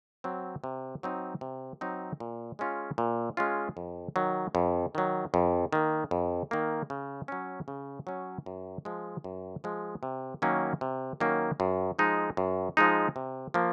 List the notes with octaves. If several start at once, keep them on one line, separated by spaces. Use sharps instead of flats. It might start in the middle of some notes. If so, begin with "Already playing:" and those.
F#3 C4
C3
F#3 C4 D#4
C3
F#3 C4 D#4
A#2
G#3 C#4 F4
A#2
G#3 C#4 F4
F2
D#3 F#3
F2
D#3 F#3
F2
D#3 A#3
F2
D#3 A#3
C#3
F#3 C#4
C#3
F#3 C#4
F#2
F3 G#3
F#2
F3 G#3
C3
D#3 F#3 A#3 C#4
C3
D#3 F#3 A#3 C#4
F#2
F3 G#3 D#4
F#2
F3 G#3 D#4
C3
F3 A#3